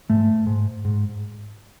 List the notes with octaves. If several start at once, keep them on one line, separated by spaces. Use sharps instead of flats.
G#2 A3
G#2
G#2